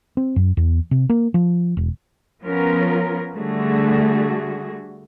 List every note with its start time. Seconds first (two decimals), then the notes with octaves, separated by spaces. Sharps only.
0.17 C4
0.36 F#2
0.57 E2
0.91 C3
1.09 A#3
1.34 F3
1.77 E1
2.42 F3 B3 C#4 F4 A#4
3.34 D3 G3 A3 F#4 G#4